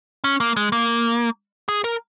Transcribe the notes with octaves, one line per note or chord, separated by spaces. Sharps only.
C#4
A#3
G#3
A#3
G#4
A#4